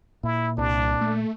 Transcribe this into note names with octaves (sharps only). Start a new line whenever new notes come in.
A#2 E4
C2 D4
A3